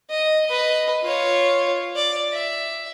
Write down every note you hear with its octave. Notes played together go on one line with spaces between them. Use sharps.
D#5
B4 D#5
F4 C#5
D5
E5